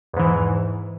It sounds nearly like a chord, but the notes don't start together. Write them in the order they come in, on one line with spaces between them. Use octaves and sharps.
E2 G#2 E3